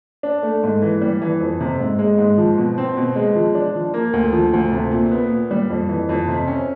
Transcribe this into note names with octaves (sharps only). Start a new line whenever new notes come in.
D4
A3
G#2
E3
G3
E3
F2
C3
G#2
G#3
G#2
F3
B2
C4
B2
G#3
F3
D4
F3
A#3
D2
F3
D2
C3
A#2
B3
A#2
G3
F2
E3
F2
C3
C#4